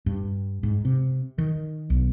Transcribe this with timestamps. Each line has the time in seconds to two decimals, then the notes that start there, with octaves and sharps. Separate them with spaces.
0.06 G2
0.63 G#2
0.85 C3
1.38 D#3
1.90 B1